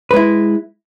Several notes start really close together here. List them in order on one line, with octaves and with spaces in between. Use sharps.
B4 G#3 E4